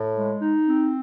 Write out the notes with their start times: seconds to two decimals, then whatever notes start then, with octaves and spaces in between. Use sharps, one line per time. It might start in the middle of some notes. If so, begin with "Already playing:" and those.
Already playing: A2
0.15 G#3
0.41 D#4
0.66 C4